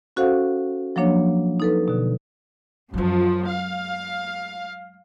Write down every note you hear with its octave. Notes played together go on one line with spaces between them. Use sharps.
C#4 F#4 A4 C5 F5 F#5
F3 F#3 A#3 D4 C#5
D#4 A4 B4
B2 D3
F#2 F3 F#3 G#3
F5